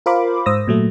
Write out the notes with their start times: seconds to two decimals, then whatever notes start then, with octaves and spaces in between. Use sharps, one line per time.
0.06 F4 A#4 C5 F5 B5 D6
0.46 G#2 C5 D#6 E6 A#6
0.68 A#2 F#3 A3